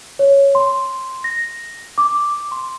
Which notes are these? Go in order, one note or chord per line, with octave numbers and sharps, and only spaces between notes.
C#5
C6
A#6
D6
C6